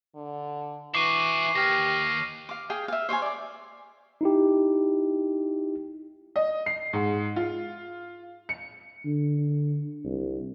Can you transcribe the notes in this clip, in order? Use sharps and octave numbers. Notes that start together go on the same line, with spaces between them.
D3
E3 E4 F#4 C#6 D6 C7 D#7
D#2 G4 F6 A#6
F5 D6
G#4 F5 G5
E5 F5
C5 C#5 F5 G#5
D5 D6
D#4 E4 G4
D#5
C7
G#2
F4
C#7
D3
C2